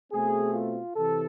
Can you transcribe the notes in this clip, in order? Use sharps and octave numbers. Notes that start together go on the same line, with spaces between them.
B2 A3 C4 G#4
F4
C3 E3 A4